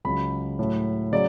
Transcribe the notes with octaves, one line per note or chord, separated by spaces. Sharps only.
C#2 C#3 F#3 B5
A2 F#3 A3
C#3 F#3 D5